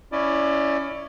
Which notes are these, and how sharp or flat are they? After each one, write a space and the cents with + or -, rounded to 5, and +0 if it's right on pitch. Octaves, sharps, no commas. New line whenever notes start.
C#4 +15 E4 +0 D5 +25